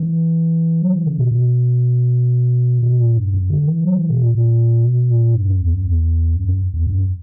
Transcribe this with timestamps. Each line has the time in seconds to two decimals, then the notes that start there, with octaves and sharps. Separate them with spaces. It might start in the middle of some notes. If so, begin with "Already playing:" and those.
Already playing: E3
0.82 F#3
0.94 E3
1.07 C#3
1.19 B2
1.31 B2
2.83 B2
3.00 A#2
3.17 G2
3.34 F#2
3.50 D3
3.67 E3
3.84 F#3
3.97 E3
4.10 B2
4.22 A#2
4.35 A#2
4.85 B2
5.10 A#2
5.35 G2
5.48 F#2
5.61 E2
5.73 F#2
5.86 E2
6.36 F#2
6.48 F#2
6.74 E2
6.87 G2
6.96 F#2